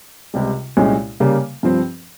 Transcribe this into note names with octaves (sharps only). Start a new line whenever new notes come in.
C#2 C3 G3
C2 A#2 G#3 C#4
C#3 G3 A#3
G2 F3 C4